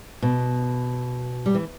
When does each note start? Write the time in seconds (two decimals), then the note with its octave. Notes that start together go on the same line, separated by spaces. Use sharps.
0.22 B2
1.46 G3
1.55 E3